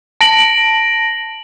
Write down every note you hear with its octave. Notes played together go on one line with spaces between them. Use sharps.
A5 A#6 D7 F#7